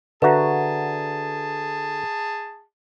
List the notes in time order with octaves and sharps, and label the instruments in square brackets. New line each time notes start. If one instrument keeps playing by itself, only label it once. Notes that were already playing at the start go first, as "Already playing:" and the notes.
[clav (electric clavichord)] D3 F#4 [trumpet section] G#4 A5 [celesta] B4 E5 A#5